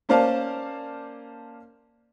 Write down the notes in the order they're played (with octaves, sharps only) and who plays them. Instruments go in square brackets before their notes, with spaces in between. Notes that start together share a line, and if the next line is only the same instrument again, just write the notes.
[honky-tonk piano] A#3 C#4 C5 D5 F5 A5